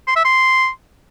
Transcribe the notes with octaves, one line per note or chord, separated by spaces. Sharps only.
C6
E5
C6